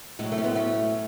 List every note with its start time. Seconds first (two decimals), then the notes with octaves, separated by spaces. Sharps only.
0.19 A2 F#3 G#3
0.32 A3
0.38 C#4
0.44 G#3 B3
0.56 A3 C#4